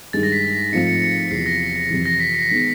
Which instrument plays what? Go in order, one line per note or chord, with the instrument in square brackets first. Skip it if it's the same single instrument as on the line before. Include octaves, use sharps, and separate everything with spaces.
[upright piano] G2 D#3 G#3 [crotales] A6
[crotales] A#6
B6
[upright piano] G#2 F3 A3 C4 D#4 [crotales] C#7
[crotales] C#7
C#7
[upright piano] E2 C3 F3 [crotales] C7
[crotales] A#6
[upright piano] F2 C3 E3
[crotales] A#6
B6
C7
[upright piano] D#3 G#3 B3 [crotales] B6